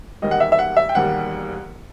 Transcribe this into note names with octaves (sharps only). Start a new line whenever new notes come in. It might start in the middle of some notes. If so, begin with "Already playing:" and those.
E1 D#2 D#3 G3 D#5
F#5
E5
E5
F#5
E5
G5
E1 D#2 D#3 G3 F#5